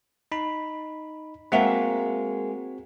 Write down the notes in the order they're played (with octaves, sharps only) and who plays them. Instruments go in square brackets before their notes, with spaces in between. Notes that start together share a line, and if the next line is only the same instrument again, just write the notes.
[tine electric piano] D#4 B5
[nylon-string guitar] G#3 A#3 [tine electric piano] C4 F#4 [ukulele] E5 F#5